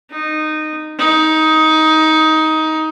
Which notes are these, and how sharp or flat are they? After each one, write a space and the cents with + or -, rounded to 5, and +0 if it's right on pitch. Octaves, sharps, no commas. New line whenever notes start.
D#4 -15
D#4 +15